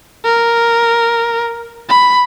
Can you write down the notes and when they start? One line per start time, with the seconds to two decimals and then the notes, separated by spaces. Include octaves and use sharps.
0.25 A#4
1.89 B5